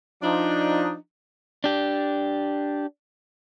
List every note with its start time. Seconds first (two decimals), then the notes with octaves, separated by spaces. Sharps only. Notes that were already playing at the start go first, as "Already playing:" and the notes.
0.23 F3 D4 D#4
1.64 D4 G4